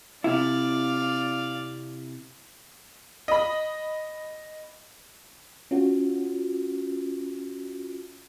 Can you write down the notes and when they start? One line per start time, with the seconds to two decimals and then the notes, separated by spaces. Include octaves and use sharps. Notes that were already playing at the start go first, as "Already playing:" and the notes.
0.24 C3 E4 D5 F5
3.28 D#5 B5
5.71 C#4 F4 F#4